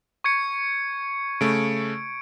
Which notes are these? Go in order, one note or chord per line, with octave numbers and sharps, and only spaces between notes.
C#6 G#6 C#7
C#3 A3 D7